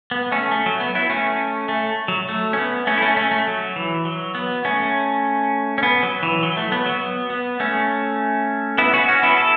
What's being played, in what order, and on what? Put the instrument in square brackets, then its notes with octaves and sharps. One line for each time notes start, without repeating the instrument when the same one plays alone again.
[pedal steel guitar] B3
A3 C#4
A3
F#3
B3
B3 E4
A3 C#4
A3
F#3
A3
C#4
B3
A3 C#4
E4
A3 C#4
A3 C#4
A3
F#3
E3
F#3
B3
A3 C#4
C#4
B3
F#3
E3
F#3
A3
B3
F#3
B3
B3
A3 C#4
B3 E4
C#4 F#4
C#4 F#4
B3 E4
E4 A4